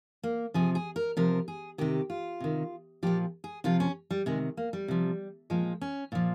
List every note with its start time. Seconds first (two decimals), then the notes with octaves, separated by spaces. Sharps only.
0.23 A#3
0.54 C3 F3 G#4
0.75 G#4
0.96 A#4
1.17 C3 F3 A#4
1.48 G#4
1.78 C3 D#3 G4
2.10 F4
2.40 C3 D#3
3.03 A#2 F3 G4
3.44 G#4
3.64 C3 F3 F4
3.80 C#4
4.10 G3
4.26 C3 D#3 G#3
4.57 A#3
4.73 G3
4.88 C3 F3
5.50 A#2 F3 G#3
5.81 C#4
6.12 A#2 F3